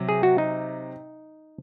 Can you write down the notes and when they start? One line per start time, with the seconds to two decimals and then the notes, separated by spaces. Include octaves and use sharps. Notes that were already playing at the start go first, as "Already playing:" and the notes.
Already playing: C3 F#3
0.09 G#4
0.23 F#4
0.38 D#4